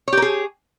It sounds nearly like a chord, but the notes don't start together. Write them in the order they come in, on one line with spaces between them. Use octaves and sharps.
C#5 G4 A#4 G#4